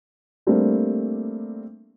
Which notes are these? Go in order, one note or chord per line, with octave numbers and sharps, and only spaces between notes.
G3 A3 A#3 C4 D4